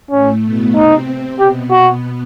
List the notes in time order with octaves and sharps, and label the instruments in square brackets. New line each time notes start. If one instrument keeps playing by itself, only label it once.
[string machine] A2 A3 [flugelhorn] C#4
[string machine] B2 B3
[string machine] C3 C4 [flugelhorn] D#4
[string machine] B2 B3 [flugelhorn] G4
[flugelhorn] F#4